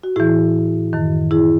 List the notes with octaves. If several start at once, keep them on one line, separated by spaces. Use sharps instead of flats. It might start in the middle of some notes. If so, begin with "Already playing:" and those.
F#4
A2 E3 E4 G#4
F#2 D#3
E4 G#4